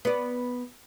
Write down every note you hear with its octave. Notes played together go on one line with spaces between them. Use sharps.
B3 D5